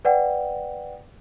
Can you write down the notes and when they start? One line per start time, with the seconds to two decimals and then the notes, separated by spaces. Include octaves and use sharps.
0.05 B4 D5 F#5 G5